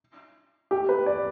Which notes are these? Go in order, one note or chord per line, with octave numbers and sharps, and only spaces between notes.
G4
B4
D5